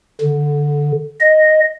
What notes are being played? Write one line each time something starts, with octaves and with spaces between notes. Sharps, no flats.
D3
D#5